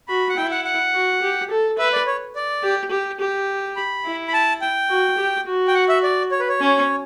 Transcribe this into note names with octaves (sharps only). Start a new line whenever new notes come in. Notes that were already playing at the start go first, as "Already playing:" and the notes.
F#4 B5
F#5
E4 G5
F#5
F#5
F#4
G4
A4
B4 E5
D5
C#5
D5
G4
G4
G4
B5
E4
B5
A5
G5
F#4
G4
F#4
G5
F#5
E5
D5
C#5
B4
C#5
C#4